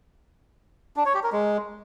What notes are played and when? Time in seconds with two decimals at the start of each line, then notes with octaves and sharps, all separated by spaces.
0.96 D4
1.05 C#5
1.14 G4
1.23 A#4
1.32 G#3